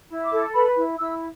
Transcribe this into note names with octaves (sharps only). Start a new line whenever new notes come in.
E4
D6
A4
B4 B5
E4
E4 E6